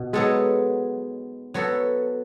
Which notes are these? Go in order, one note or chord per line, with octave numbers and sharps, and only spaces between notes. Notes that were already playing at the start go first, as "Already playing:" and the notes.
Already playing: B2
F#3 G#3 B3 D#4 A4
F#3 B3 F#4 A4